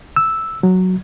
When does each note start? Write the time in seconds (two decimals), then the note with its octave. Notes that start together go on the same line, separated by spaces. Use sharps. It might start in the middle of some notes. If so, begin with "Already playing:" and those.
0.16 E6
0.63 F#3